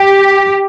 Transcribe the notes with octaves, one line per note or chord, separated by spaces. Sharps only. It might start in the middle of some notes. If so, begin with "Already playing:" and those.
Already playing: G4